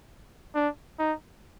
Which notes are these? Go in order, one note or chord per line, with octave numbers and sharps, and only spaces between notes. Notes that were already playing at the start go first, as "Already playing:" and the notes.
D4
D#4